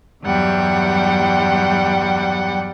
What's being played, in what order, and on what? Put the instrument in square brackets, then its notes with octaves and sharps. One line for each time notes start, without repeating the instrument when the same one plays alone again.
[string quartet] E2 G2 F#3 G3 F#5 G5